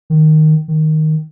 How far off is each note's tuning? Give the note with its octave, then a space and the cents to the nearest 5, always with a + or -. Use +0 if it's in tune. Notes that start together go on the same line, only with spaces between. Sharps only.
D#3 -5
D#3 +0